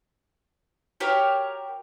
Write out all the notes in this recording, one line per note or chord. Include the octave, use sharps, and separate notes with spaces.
F#4 G4 A#4 C#5